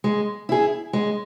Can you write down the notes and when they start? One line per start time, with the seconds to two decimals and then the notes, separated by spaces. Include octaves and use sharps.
0.04 G#3
0.49 E4 G#4
0.93 G#3